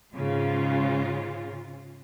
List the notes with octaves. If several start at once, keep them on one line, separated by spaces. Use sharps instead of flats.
G#2 C#3 F4